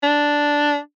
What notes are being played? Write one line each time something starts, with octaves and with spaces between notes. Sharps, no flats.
D4